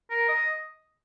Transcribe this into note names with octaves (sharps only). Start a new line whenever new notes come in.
A#4
D#5